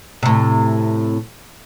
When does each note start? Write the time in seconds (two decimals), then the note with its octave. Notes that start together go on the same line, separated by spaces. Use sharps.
0.23 A2 C3